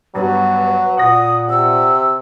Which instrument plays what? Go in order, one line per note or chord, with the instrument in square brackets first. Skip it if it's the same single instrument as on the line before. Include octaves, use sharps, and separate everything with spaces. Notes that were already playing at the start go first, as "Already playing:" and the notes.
[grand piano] G2 B3 [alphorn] F#3 [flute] B4
[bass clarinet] A#2 [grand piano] F#5 A#6 [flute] D#6
[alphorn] C3 [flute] E6